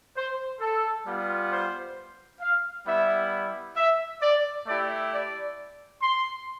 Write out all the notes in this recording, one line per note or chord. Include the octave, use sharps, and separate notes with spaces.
C5
A4
G3 B3 F4
C5
F5
G3 B3 E4 E5
E5
D5
A3 E4 G4 D5
D5
C6